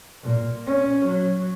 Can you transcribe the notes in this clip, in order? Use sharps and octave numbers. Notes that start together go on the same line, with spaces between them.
A#2
C#4
F#3